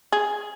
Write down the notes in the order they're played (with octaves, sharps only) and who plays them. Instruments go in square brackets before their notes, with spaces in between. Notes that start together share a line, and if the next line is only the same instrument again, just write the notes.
[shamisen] G#4